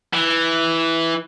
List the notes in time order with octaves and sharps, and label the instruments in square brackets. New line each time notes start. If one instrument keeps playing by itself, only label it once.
[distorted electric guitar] E3